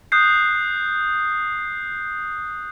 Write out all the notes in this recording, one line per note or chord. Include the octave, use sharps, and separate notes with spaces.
D#6 F#6 G6 C7